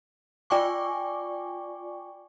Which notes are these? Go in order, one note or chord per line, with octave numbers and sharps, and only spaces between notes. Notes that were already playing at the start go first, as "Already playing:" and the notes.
F4 D5 G5 G#5 C#6 D6